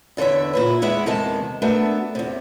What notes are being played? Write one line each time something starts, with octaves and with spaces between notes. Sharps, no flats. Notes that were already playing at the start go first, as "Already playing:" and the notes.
E2 D3 E3 C#5 E5
A#2 E4 B4
E2 G#3 B3 E4 E5
E2 C3 D#3 G#3 A5
A3 B3 D4 F#4 A#4 E5
E2 C3